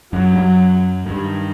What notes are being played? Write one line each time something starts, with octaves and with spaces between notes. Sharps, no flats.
F#2 F#3
G2
F#2
F#2
G2 D#3